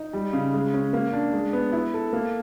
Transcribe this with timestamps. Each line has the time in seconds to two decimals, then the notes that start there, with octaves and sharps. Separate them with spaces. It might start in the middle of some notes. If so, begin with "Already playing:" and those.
Already playing: D#4
0.13 G3
0.33 C#3
0.54 G#3
0.74 C#4
0.93 A#3
1.13 D4
1.33 G#3
1.53 B3
1.73 E4
1.94 A4
2.13 A#3